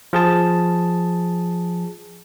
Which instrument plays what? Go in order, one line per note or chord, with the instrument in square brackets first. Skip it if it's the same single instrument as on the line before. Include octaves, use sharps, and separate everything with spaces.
[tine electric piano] F3 G#4 A5